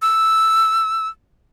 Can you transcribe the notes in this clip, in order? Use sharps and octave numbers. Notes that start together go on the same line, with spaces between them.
E6